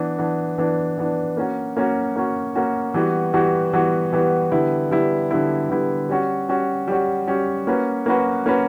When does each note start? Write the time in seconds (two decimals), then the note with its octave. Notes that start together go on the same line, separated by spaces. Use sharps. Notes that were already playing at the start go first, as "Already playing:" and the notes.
Already playing: E3 B3 D4
0.19 E3 B3 D4
0.58 E3 B3 D4
0.98 E3 B3 D4
1.37 A#3 C#4 F#4
1.77 A#3 C#4 F#4
2.16 A#3 C#4 F#4
2.55 A#3 C#4 F#4
2.94 E3 G3 B3 F#4
3.34 E3 G3 B3 F#4
3.73 E3 G3 B3 F#4
4.13 E3 G3 B3 F#4
4.52 D3 G3 B3 E4
4.91 D3 G3 B3 E4
5.31 D3 G3 B3 E4
5.69 D3 G3 B3 E4
6.09 G3 C#4 F#4
6.48 G3 C#4 F#4
6.88 G3 C#4 F#4
7.28 G3 C#4 F#4
7.67 A#3 C#4 F#4 B4
8.06 A#3 C#4 F#4 B4
8.46 A#3 C#4 F#4 B4